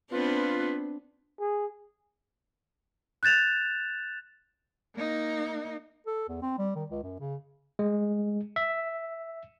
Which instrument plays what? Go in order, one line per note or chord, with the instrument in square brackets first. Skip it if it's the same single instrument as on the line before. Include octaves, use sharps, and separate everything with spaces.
[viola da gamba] B3 C4 D4 [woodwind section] F4 B4
[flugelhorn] G#4
[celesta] F#6 G6 A6 E7 F7
[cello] A#3 D#4
[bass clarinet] A4
E2
C4
G3
D#3
C#2
F#2
C#3
[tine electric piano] G#3
E5